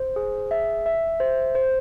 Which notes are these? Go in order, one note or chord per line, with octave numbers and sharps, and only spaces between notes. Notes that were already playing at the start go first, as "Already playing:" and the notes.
Already playing: C5
G#4
E5
E5
C5
C5